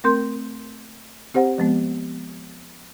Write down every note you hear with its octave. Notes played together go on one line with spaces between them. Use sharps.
A3 C4 A#4 C6 G6
C4 G4 C5 F#5
F3 G#3 B3